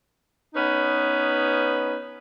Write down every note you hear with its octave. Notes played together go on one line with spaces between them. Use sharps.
B3 C#4 D#4 B4